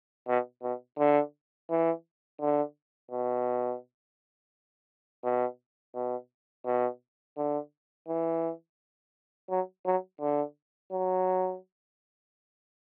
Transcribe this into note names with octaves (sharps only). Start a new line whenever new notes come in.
B2
B2
D3
E3
D3
B2
B2
B2
B2
D3
E3
F#3
F#3
D3
F#3